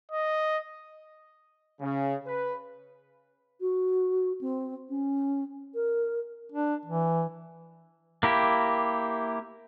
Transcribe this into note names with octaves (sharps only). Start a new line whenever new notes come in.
D#5
C#3
B4
F#4
C4
C#4
A#4
D4
E3
A#3 E4 G4